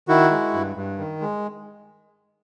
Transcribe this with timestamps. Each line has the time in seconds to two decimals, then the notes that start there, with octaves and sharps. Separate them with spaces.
0.08 D#3 E4 F#4
0.31 G#3
0.54 G2
0.76 G2
0.99 D#3
1.21 G#3